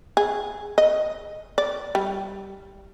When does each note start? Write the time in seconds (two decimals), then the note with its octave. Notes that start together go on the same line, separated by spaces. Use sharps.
0.17 G#4
0.78 D#5
1.58 D5
1.95 G3